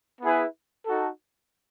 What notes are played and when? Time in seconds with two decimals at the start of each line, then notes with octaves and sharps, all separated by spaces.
0.21 B3 E4 G#4 B4
0.85 D#4 F#4 A4